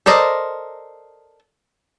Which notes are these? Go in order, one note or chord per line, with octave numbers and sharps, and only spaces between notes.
A4 A#4 C5 D5 D#5